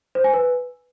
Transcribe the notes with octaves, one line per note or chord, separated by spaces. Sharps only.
C5
G#5
B4